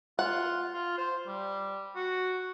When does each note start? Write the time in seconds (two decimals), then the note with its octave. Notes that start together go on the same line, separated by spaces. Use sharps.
0.19 F4 F#5
0.74 F4
0.98 C5
1.27 G3
1.96 F#4